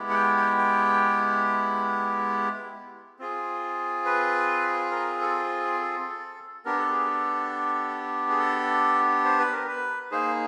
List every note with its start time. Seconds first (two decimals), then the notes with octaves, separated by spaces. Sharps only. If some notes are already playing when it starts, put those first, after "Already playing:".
Already playing: G#3 B3 E4 G4
0.10 F#5
0.14 G5
0.37 G5
0.58 G5
3.19 C4 F4 G#4
4.05 B4
4.91 A#4
5.21 A4
5.79 A4
6.65 B3 D4 G4 A#4
6.79 A4
6.92 G#4
7.06 A4
8.30 G#4
8.39 A4
9.25 C5
9.39 B4
9.53 A#4
9.67 B4
10.11 A#3 D#4 G#4 C5